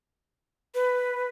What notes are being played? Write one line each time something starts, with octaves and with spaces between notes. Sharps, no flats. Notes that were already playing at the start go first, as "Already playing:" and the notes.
B4